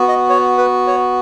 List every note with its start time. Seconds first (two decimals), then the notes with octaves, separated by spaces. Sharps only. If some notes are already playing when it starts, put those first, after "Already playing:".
Already playing: B3 F#4
0.08 D#5
0.30 C#5
0.58 B4
0.87 C#5